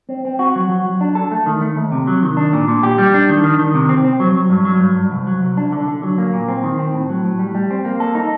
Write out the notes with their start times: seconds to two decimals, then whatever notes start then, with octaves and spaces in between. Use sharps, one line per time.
0.09 C4
0.25 C4
0.39 F#4
0.56 F#3
0.70 F#3
0.86 F#3
1.01 D4
1.15 A4
1.32 A3
1.46 D#3
1.61 A3
1.76 D#2
1.92 C3
2.07 F#3
2.23 D#3
2.37 D4
2.53 A#2
2.68 A#2
2.83 G4
2.98 G3
3.14 D4
3.29 D#3
3.43 D#3
3.59 D#3
3.74 C3
3.89 C4
4.05 C4
4.20 F#3
4.35 F#3
4.50 G2
4.65 F#3
4.80 G2
4.96 G2
5.11 C2
5.27 F#3
5.42 C2
5.57 D4
5.72 D3
5.88 D3
6.03 F#3
6.18 A#3
6.33 A#2
6.48 C4
6.64 D#3
6.79 C4
6.94 A2
7.10 F#3
7.24 A2
7.39 G3
7.55 G3
7.71 C4
7.85 A#3
8.00 A4
8.15 D#4